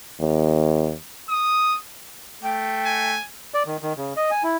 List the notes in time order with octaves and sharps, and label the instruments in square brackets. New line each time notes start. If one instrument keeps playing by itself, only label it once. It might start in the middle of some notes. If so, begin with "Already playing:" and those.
[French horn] D#2
[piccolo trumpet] D#6
[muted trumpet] A3 [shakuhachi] G5
[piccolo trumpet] G#5
[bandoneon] D5
D#3
D#3
C#3
D#5
G#5
E4